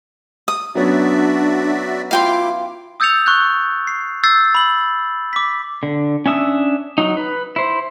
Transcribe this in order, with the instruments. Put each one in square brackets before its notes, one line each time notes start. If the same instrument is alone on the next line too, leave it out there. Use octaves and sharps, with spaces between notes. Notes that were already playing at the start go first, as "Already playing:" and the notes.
[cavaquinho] D#6
[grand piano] F#3 B3 C#4 [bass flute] D4 [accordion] F#4 D5 E5
[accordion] E4 D6 [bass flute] F4 [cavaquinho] F5 G5 C6
[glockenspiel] D#6 E6 G6 A6 C#7 F7
C#6 F#6 G6
C7
E6 G6 A6 C7
B5 F#7
D6 B6
[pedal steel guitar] D3
C#4 D4 E5 D#6 E6
F#3 D#4
B4
E4 C5